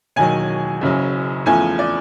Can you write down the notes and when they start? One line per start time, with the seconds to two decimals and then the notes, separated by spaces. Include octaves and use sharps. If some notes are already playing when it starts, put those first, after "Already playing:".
0.16 E1 D#2 D#3 F#3 G#5
0.81 F#1 F#2 C#3 F#3
1.46 E2 C#3 F3 A3 G#5
1.79 D5